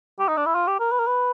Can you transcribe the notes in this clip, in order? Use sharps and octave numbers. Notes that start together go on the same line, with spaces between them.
G4
D#4
D4
E4
F4
G4
A#4
B4
A#4
B4